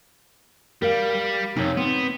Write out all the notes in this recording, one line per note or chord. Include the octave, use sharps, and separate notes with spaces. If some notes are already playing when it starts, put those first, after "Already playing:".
G3 A#4 F5
F2 C3 D#4 C#5
B3 C4